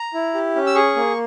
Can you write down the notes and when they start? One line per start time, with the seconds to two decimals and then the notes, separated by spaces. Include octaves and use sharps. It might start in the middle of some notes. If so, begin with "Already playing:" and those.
Already playing: A#5
0.14 E4
0.34 G4
0.56 C#4
0.67 E6
0.75 G#4 C#6
0.96 A#3